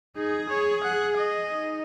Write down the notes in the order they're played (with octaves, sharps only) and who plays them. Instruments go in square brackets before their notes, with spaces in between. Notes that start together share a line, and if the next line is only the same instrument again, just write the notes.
[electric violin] D#4 [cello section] G#4
[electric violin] C#5
F#5
D#5
[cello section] D#4